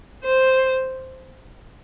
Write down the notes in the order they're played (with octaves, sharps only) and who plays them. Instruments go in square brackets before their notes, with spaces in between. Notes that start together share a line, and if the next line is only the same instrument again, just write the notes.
[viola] C5